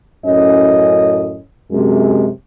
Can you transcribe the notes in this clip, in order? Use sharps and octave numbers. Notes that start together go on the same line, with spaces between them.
F#2 A2 C#4 D#5
F#2 C3 G#3